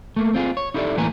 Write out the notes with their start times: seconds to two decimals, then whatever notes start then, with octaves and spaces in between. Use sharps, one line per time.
0.16 A3 A#3
0.34 C4 F4 G#4
0.57 C#5
0.74 D#4 E4 G4 A4 A#4 D5
0.97 A2 E3 A#3 B4 G#5 A#5